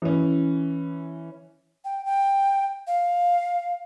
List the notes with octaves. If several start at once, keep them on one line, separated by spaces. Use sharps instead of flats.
E3 C#4
G5
G5
F5